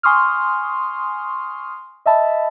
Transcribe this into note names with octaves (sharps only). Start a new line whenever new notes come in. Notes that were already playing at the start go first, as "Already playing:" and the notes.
G#5 C6 C#6 D#6 F6
D#5 E5 A5 B5